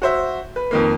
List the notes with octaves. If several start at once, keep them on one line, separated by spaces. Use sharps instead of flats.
F#4 C5 E5
B4
F2 D#3 A#3